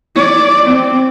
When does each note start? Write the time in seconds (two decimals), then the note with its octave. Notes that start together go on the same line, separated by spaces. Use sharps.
0.16 D5
0.66 C4